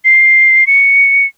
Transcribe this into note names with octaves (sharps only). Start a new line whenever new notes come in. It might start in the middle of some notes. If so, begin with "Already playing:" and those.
C7
C#7